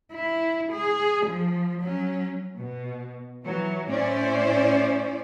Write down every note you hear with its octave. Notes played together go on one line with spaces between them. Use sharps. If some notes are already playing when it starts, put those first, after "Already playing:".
E4
G#4
F3
F#3 C#4
B2
E3 F#3
A2 C#4 E4 C5 D5